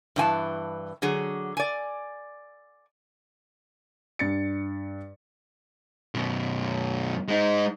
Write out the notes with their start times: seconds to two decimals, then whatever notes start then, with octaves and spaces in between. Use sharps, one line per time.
0.16 G2 E3 G#5 A5
1.02 D3 F#3 G#4
1.57 D5 G#5
4.19 G2 A6 C#7
6.15 F#2 B2
7.28 G#3 D#4